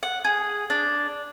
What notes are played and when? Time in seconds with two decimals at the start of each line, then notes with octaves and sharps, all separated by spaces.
0.03 F#5
0.24 G#4
0.70 D4